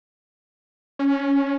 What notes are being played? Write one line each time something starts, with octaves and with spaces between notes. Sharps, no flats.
C#4